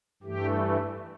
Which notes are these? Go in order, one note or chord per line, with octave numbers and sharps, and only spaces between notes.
G2 E3 A3 G4